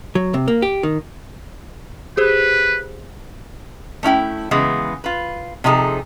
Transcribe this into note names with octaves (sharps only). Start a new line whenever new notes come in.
F#3
C3
A#3
G4
D#3
G4 G#4 B4 C5
A3 C#4 E4 G5
C#3 E3 G#3 B3
F4 B4
C3 F3 D#4 G#4 A4